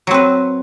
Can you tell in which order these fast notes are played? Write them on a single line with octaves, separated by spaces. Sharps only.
F#3 C4 B4